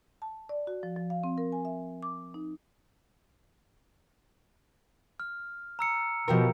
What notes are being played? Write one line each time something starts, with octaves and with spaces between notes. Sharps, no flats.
A5
D5
F#4
F3
F3
F5
C4
A#4
G#5
E5
D6
D#4
F6
A#5 E6 C#7
B2 F3 G4 A#4